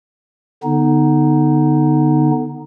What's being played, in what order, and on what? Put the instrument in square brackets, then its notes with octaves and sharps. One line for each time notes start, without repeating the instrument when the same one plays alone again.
[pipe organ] D3 B3 D#4